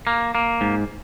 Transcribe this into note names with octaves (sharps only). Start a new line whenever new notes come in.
A#3
A#3
G#2